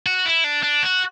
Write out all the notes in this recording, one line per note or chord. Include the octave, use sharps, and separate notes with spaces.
F#4
E4
D4
D4
F#4